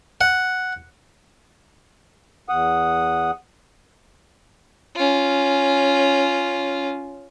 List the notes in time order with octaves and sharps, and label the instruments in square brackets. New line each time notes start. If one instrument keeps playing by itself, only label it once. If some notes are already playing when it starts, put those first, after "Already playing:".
[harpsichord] F#5
[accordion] E2 F#5 D#6
[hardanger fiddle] C#4 F4